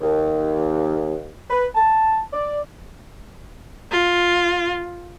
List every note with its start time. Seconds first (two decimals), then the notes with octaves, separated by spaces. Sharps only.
0.01 D#2
1.50 B4
1.75 A5
2.33 D5
3.92 F4